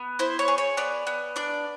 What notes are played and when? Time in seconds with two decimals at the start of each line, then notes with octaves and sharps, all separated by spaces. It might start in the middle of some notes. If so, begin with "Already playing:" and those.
Already playing: B3
0.19 E4 C5
0.39 C#5
0.48 G#4
0.58 C#5
0.77 B3 D5
1.07 B3
1.36 D4 D5